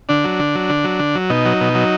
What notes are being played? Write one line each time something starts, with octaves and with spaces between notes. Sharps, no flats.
D3 D4
F#3
D3
F#3
D3
F#3
D3
F#3
B2 D#4
F#3
B2
F#3